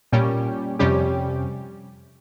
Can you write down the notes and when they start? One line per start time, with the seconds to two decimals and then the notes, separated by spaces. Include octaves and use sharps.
0.12 A#2 G3 C#4 G4
0.79 F2 C3 G3 C#4 G4